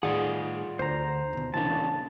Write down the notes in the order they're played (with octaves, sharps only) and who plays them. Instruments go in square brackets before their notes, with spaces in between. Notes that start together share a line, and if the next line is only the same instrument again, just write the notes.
[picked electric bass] A2 D#3 [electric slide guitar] F4 D5 F#5 [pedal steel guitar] G#4
[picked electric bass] D2 D3 [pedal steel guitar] C5 A#5
[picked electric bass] D#2 B2
[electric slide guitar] A#2 C#3 D4 [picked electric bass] E3 [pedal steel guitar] A5